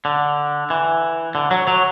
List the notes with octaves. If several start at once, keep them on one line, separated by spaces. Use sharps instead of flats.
D3
E3
D3
F#3
F#3